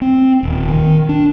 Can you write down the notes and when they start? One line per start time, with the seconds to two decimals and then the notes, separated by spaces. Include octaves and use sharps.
0.01 C4
0.43 D#1
0.69 D#3
1.09 D4